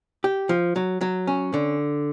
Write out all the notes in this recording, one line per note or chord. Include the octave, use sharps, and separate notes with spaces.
G4
F3
F#3
F#3
C#4
D3